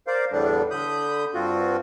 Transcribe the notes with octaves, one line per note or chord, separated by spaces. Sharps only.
A#4 C5 D5 F5
E2 A2 D3 G3 B3 D4
D3 B5 D#6 G6
G2 C4 F4 F#4